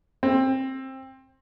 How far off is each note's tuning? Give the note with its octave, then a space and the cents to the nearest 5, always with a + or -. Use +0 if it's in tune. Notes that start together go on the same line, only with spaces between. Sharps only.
C4 +20